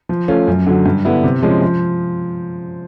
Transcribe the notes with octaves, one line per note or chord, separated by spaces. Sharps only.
F3
A3 C#4 F4
F#2
D3 F#3
G2
D3 G3 B3 E4
C3
F3 G#3 C#4
F3